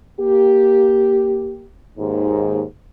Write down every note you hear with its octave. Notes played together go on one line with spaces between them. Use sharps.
A#3 G4
D#2 G#2